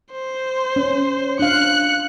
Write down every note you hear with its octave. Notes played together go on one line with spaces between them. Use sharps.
C5
C#4
D4 F5 F#6 C#7